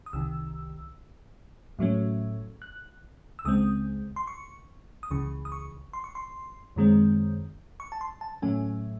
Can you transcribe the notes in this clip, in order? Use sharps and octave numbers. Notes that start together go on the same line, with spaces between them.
D#6
C2 C3 D#3 E6
A2 F#3 A3 C#4
F#6
E6
C#2 C#3 G#3 C4 D#6
C6
C#6
D#6
C#2 C#3 E3 C#6
D#6
C#6
C6
C#6
C6
F#2 D#3 G#3 C4
C#6
A5
C6
A5
A2 F#3 A3 C#4 G#5